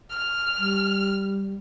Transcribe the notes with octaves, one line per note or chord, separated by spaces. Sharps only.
F6
G3